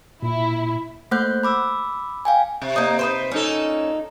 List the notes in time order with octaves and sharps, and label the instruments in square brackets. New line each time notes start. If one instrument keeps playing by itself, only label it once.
[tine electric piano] A#2 [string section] E4
[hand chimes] A3 A#3 C5 F#5 F#6 G6
B5 D6 E6
F5 G5 G#5
[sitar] C3
[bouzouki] A#3 D#4
D#4 B4 C5
[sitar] A#2 D#4 A4 [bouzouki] C#4